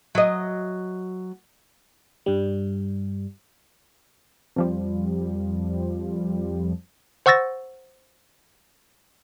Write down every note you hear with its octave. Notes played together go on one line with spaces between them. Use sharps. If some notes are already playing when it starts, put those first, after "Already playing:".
F#3 D#5
G2 G3
F2 F3 G3
C5 F#5 C#6 E6 A6 A#6